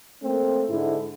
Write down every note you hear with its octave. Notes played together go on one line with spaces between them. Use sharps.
A3 A#3 C4
G#2 D3 E4